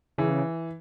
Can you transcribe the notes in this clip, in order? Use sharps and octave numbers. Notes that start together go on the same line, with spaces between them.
C#3 E3